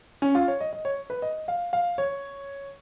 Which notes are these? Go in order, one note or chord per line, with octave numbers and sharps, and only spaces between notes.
C#4
F4
C#5
D#5
D#5
C#5
B4
D#5
F5
F5
C#5